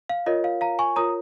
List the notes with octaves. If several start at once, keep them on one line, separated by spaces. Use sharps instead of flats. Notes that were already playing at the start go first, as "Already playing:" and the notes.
F5
F4 A#4 C#5 D#5
F5
F5 A#5
G#5 C#6
F4 A#4 C#5 A#5 D#6